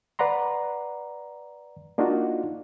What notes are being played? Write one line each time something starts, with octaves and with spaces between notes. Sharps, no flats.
B4 D5 F#5 A#5 C6
A#3 D4 D#4 F4 F#4